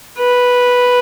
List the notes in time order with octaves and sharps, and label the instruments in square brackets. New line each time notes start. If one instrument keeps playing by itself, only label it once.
[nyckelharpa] B4